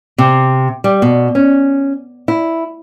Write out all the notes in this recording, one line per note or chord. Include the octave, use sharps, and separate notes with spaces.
C3
G3
B2
C#4
E4